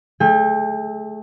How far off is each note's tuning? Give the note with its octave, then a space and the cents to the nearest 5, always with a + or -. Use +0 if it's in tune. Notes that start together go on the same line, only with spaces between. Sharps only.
A3 -25 G#4 +0 G5 +30